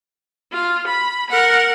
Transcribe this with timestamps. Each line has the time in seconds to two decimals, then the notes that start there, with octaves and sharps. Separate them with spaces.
0.52 F4
0.87 B5
1.30 A#4 F#5